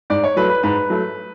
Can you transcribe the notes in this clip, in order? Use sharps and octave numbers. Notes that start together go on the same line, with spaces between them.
G#2 D5
C#5
F#3 A3 B4
B4
G#2 B4
F#3 A3